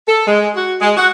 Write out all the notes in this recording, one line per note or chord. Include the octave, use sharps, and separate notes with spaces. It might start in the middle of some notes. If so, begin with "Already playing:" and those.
A4
G#3
F#4
G#3
F#4